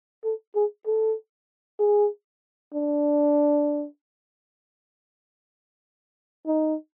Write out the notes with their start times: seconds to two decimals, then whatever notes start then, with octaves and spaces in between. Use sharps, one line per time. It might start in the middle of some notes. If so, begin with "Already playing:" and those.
0.24 A4
0.55 G#4
0.86 A4
1.79 G#4
2.74 D4
6.47 D#4